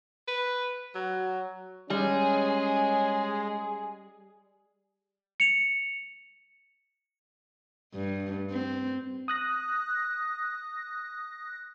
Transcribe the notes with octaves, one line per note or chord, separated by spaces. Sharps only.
B4
F#3
G3 G#3 C#4 G#4
C#7 F7
G2
C4
D#6 F#6 A#6